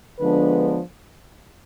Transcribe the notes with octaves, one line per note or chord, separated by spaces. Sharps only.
D3 F3 G#3 B3 D4 B4